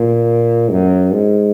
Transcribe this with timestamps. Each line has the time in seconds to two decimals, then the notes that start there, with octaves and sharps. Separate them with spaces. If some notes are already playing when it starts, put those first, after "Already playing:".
Already playing: A#2
0.71 F#2
1.12 G#2